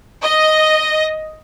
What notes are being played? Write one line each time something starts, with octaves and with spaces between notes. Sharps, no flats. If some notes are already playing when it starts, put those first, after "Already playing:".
D#5